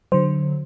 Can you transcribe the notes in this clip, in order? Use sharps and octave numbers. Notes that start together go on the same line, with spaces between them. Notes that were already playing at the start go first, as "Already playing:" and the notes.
D3 F#3 C5